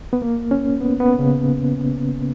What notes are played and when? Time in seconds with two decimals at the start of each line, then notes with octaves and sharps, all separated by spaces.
0.13 B3
0.22 A#3
0.51 C#4
0.80 B3
1.00 B3
1.19 C#3